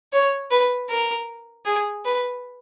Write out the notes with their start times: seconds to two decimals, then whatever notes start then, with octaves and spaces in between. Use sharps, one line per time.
0.13 C#5
0.51 B4
0.90 A#4
1.66 G#4
2.05 B4